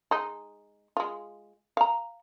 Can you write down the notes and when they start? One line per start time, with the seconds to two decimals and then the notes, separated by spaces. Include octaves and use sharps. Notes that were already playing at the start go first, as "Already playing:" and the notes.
0.11 G#3 D#4
0.97 G#3 F4
1.77 F5 A#5